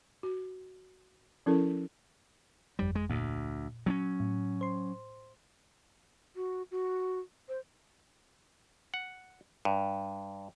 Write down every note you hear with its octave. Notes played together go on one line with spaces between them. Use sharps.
F#4
F3 C#4 E4 A4 A#4
G1 F2 G3
G#3
D2 A#2
F#3 C4 C#4
A2
C5 C6
F#4
F#4
C5
F#5
G2